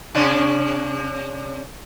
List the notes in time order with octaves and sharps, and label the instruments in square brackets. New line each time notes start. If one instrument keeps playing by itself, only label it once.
[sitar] C3 C#4 D4